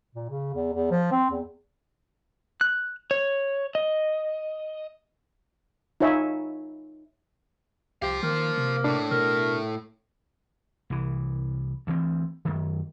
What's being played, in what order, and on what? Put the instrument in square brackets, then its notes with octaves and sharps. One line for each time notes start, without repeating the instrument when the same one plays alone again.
[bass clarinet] A#2
C#3
E2
E2
F3
C4
E2
[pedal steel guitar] F#6
C#5
D#5
[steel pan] D#4 F4 C#5 E5 G#5
[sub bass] C2 [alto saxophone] G4 [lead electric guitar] C5 F5
[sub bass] D#3 [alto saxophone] A#3
[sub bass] C3
[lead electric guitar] A2 [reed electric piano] D4
[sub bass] B2 [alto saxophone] A#4
[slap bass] C2 E3
D2 E3 C4
F#2 D#3